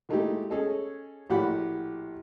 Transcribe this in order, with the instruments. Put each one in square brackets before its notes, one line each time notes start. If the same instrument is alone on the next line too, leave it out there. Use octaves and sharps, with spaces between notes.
[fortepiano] A#2 G#3 A3 D#4 E4 G4
C#4 G#4 A4 D#5
A#1 A2 F#4 G4 F#5 B5